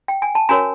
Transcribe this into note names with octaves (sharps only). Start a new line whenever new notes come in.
G5
G#5
A5
C#4 F#4 A#4 C#5 G#5 A#5